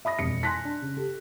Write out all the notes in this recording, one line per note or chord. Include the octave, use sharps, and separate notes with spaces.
E5 B5 D#6 A#6
E1 F2 C#7
G#5 C6 F#6 A#6 B6
D4
C#3
G4 A4